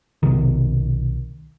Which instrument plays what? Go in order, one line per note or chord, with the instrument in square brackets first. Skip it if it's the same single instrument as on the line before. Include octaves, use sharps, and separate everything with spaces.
[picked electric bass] B1 C3 D#3